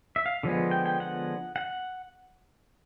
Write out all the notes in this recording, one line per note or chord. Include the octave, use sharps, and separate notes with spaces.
E5
F5
D3 F3 G#3 B3
G5
G5
F#5
F#5